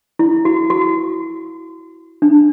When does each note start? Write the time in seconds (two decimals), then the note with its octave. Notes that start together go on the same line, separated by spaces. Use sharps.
0.19 E4
0.45 F#4
0.70 F#4
2.22 D4